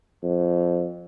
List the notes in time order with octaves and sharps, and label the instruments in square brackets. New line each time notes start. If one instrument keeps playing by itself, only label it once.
[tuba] F2